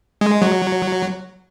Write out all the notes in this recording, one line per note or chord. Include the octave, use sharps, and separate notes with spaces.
G#3
F#3